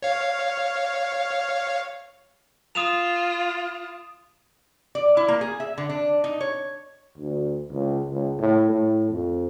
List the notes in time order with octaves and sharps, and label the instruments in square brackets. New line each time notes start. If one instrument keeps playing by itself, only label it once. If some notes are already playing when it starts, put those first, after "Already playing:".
[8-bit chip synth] C#5 F5
[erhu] F4 [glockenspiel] D#6 E7 F7
[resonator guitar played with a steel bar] D5
E4
A#3
G#4
E5
D3
D4
D#4
C#5
[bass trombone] D2
C#2
C#2
A2
A2
F2